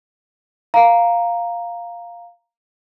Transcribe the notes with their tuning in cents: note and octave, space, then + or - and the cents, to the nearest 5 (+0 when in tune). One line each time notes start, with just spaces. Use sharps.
F5 +0 A#5 +0